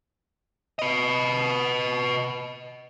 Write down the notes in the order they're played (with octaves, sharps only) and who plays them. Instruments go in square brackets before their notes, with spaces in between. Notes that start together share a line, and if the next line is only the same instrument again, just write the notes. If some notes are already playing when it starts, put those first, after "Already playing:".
[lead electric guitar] B4 D#5